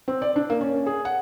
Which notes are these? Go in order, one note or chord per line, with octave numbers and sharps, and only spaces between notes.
C4
D5
D4
A#3
C#4
G#4
F#5